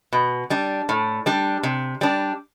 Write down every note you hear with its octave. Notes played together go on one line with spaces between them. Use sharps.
B2
G3 D4
A2
G3 D4
C3
G3 D4